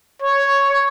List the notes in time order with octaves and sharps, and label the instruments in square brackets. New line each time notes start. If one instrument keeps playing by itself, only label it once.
[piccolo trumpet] C#5